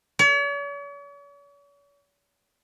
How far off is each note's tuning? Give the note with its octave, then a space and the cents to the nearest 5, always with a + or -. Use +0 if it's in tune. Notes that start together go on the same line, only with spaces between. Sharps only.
C#5 +45